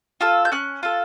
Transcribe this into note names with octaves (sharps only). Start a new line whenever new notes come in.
F4 A4 E6
G6
C#4 F#6
F4 A4